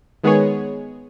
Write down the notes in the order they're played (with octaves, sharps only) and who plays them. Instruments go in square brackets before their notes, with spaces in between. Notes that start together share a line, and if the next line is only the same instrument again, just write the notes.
[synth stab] D#3 G#3 B3 G#4 C#5